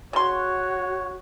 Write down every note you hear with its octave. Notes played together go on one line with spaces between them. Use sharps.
C#3 F#4 C#5 C6